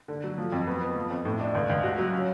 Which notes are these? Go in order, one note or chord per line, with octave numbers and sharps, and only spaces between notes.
D3
F#3
F3
F2
B3
B3
F3
F2
A2
D4
C#2
C#2
F#4
F#3
C#4